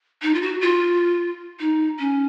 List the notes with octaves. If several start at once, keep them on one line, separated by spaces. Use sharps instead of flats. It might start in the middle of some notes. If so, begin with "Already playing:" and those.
D#4
F4
F#4
F4
D#4
C#4